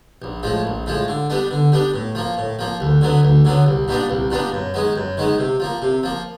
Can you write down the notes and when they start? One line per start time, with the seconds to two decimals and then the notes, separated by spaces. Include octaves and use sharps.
0.22 A#1
0.43 A2 F3 G#3
0.65 A#1
0.86 A2 F3 G#3
1.08 D3
1.30 G3 B3 D4
1.51 D3
1.72 G3 B3 D4
1.94 A2
2.15 F3 A#3
2.37 A2
2.59 F3 A#3
2.80 D2
3.01 D3 F#3 B3
3.23 D2
3.45 D3 F#3 B3
3.66 C2
3.88 A#2 G3 B3 D4
4.10 C2
4.30 A#2 G3 B3 D4
4.52 F#2
4.74 D#3 G#3 B3
4.96 F#2
5.17 D#3 G#3 B3
5.39 C3
5.60 F3 A#3
5.82 C3
6.03 F3 A#3